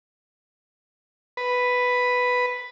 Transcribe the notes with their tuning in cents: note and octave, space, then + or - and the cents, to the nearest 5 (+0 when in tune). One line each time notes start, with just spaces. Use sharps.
B4 +0